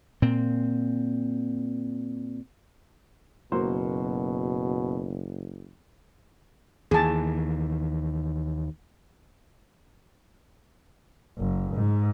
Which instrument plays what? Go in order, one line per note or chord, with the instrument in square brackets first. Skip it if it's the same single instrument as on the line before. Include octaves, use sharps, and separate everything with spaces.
[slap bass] A#2 C4
[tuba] F#1 [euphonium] B2 [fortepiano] F#3 A#3 C5
[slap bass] D#2 E3 [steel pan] G#4 A5
[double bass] F#1
G#2